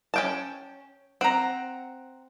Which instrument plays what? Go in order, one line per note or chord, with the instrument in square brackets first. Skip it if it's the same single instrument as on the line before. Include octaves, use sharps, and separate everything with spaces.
[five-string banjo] C#4 G5 A5
[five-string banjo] C4 [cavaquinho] F#5 A#5